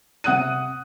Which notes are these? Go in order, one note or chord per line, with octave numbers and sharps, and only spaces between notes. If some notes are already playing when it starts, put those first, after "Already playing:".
C3 F#5 D#6 F#6 D#7